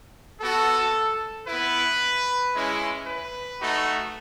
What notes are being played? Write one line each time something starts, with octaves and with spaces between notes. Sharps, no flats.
B3 F#4 A4
B3 E4 B4
G#3 C#4 E4
B4
A3 D#4 F#4